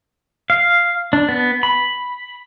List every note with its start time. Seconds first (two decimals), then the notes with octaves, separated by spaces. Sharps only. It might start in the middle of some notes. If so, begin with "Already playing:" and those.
0.50 F5
1.13 D4
1.29 B3
1.63 B5